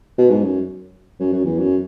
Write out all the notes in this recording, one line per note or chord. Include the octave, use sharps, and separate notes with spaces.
B2
G#2
F#2
F#2
F#2
E2
F#2